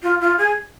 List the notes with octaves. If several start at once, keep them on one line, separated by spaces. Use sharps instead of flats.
F4
F4
G#4